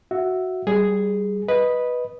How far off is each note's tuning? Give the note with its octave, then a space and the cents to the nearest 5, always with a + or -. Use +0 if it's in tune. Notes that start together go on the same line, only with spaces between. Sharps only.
F#4 +0 E5 +0
G3 -20 G#4 +0
B4 -5 D#5 +0